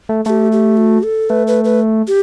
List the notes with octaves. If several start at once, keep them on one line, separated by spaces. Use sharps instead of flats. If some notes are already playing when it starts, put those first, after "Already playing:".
A3
A3 G4 A4
G4
F#4
A4
A3 B4
B4
B4
G4